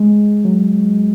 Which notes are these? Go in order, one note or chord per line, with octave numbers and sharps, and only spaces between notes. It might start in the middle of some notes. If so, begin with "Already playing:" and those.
Already playing: G#3
F#3